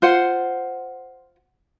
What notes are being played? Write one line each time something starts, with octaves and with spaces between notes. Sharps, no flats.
F4 C5 F#5